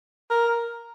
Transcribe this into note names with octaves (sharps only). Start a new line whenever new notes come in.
A#4